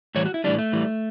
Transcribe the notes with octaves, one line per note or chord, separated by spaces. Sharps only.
A2 E3 G3 C#5
F#4
E4
A2 E3 G3 D4
A3
A2 E3 G3